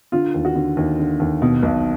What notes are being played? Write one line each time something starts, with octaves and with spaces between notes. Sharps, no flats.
D3 F4
D#2
F#4
D3
D#2
D3
D#2
B2
B1